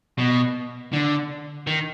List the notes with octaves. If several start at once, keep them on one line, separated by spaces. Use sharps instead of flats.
B2
D3
D#3